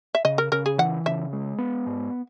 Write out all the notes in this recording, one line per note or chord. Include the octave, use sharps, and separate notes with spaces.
E5
C#3 D#5
A#4
C#3 A#4
G#4
E3 F#5
C#3 E5
G#3
B3
G#2